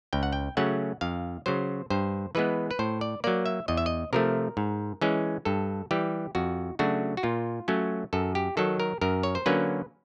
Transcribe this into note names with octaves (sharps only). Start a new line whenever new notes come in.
C#2 G5
F#5
G5
C#3 F#3 A3 C#4 F#5
F2 F5
C#3 F#3 C5
G2 C5
E3 G#3 B3 B4
B4
A2 C5
D5
F#3 A#3 D5
E5
E2 D#5
E5
D#5
C3 F3 A3 A#4
G#2
E3 G#3 C#4
G2 A4
E3 G3 G4
F2 F#4
C#3 F#3 A3 D4 F#4
F#4
A#2 F4
F#3 A3 C#4
F#2 A4
G4
D#3 F#3 A4
A#4
F#2 A#4
C#5
C5
D3 F#3 A#3 C#4 B4